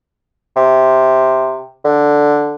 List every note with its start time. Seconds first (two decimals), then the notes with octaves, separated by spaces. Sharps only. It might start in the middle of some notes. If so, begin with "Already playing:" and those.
0.56 C3
1.84 D3